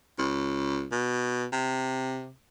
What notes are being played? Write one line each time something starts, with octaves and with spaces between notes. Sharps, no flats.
C#2
B2
C3